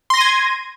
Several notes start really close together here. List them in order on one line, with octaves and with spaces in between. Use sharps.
C6 A#6 D#7 G#6